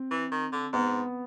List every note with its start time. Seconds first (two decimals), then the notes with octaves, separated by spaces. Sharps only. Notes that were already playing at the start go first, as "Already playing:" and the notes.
Already playing: C4
0.11 E3
0.31 D#3
0.52 D3
0.73 G#2 B3